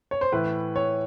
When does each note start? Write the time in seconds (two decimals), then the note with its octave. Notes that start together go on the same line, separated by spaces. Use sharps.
0.11 C#5
0.21 C5
0.32 A2 E3 B4
0.76 C#5